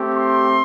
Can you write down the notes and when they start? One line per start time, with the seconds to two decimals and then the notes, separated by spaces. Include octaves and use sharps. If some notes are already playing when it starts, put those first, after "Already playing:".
Already playing: A3 C4 G4
0.14 C6